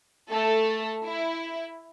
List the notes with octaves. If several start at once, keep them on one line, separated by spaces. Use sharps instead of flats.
A3 A4
E4